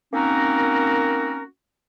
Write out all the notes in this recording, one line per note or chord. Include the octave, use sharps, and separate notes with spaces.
A#3 C4 C#4 D#4 F#4 A#4